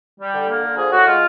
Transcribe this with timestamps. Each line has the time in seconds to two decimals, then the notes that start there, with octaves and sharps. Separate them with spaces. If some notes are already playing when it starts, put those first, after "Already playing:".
0.19 G3
0.34 D3
0.48 A#3
0.63 D3
0.78 F3 G#4
0.92 A2 F#4
1.07 G#3 F4